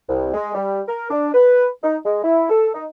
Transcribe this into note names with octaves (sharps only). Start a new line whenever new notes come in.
C2
G#3
G3
A#4
D4
B4
D#4
G#3
E4
A4
D#4